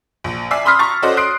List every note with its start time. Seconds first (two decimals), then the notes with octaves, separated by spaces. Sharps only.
0.24 A#1
0.51 D5 E5 G#5 E6 C7
0.65 B5 C6 D#6 F6 B6
0.79 A#5 C#6 A6
1.02 C#4 F#4 A4 C5 D5 D#5
1.17 C6 D#6 F#6 C7 D7